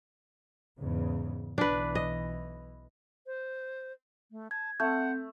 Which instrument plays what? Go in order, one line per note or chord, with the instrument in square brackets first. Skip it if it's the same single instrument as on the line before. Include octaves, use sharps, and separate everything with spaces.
[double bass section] E2 G#2 C#3
[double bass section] B1 E3 [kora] D4 B4
[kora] D#5
[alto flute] C5
A3
[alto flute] A5 [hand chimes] G#6
[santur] A3 [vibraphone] C4 [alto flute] F#5 [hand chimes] G6